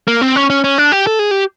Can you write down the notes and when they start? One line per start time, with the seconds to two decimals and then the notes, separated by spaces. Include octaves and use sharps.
0.08 A#3
0.21 C4
0.36 C#4
0.50 C#4
0.64 C#4
0.78 D4
0.92 G4
1.07 A4
1.19 G#4
1.31 G4